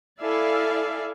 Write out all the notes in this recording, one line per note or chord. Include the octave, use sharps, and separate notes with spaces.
E4 A4 D5 E5 F5 G#5